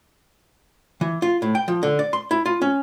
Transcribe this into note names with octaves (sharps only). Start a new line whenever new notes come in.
E3
F4
A2
G5
F3
D3
D5
C6
E4
F4
C#4